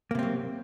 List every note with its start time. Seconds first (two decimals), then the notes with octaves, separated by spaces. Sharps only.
0.11 A#3
0.15 C3
0.19 C4
0.23 F#3